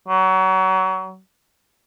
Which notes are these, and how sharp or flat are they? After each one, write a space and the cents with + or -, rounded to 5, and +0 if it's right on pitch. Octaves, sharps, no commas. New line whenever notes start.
F#3 +30